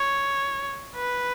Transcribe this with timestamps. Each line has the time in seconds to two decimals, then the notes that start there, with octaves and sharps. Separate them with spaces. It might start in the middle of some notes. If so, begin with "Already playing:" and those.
Already playing: C#5
0.96 B4